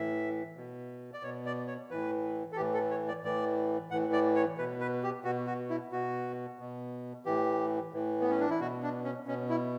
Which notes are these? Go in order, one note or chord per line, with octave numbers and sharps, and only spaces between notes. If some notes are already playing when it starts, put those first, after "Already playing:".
Already playing: A2 E3 E5
B2
D5
B2 C#5
D5
C#5
A2 E3 B4
A4
A2 E3 G4
A4
C#5
D5
A2 E3 D5
A2 E3 F#5
D5
C#5
B2 B4
B4
G4
B2 F#4
F#4
E4
B2 F#4
B2
A2 E3 G4
A2 E3
B3
C#4
D4
E4
B2 F#4
D4
C#4
B2 C#4
E4